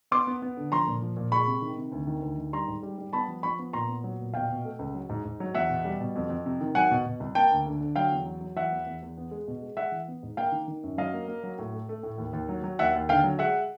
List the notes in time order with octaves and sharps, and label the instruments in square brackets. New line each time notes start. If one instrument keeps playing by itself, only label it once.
[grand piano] B3 C6 D6
B3
B3
D3
F3 A#5 C6
A#2
F3
A#2
G#3 B5 C#6
C3
D#3
C3
D2
D#3
D2
D#3
G3 A#5 C6
G#2
G3
G3
B3 A5 B5
F3
F3 B5 C#6
B3
A#2 A#5 C6
B3
F#3
A#2
B2 F5 G5
B2
A3
C#2
F#3
G#2
G#2
F#3
E2 E5 F#5
B2
G3
B2
F2
F2
C3
D#3
F#3 F#5 G#5
B2
B2
C2
A#3 G5 A5
D2
D3
D3
F#3 F5 G5
E2
F#3
F#3
E3 E5 F#5
E2
E2
E2
B3
G#3
B2
G#3
G#3 E5 F#5
E3
B3
G#2
A#3 F5 G5
D#3
D#3
F#2
F#3 D#5 F5
A#3
A#3
F#3
A2
A3
A3
A2
D#2
D#2
F#3
F#3
D#2 E5 F#5
D#2
D3 F5 G5
F#3
G#3 E5 F#5